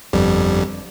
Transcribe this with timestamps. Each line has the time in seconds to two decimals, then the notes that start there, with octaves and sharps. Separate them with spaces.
0.13 G1 F2 G3